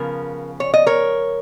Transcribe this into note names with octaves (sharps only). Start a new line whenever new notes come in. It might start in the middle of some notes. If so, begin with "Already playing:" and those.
Already playing: C#3 F3 B3 A#4
C#5
D#5
A#4 C#5